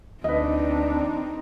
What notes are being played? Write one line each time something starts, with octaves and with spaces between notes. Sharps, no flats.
D2 C4 D4 D#4 B4 D#5